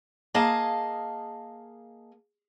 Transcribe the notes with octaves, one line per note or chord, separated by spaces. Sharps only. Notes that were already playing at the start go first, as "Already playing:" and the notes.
A#3 G#4 D#5 F5 A5